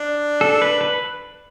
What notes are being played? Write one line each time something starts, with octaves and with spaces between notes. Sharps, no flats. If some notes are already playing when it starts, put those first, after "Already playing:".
Already playing: D4
A4
B4
B4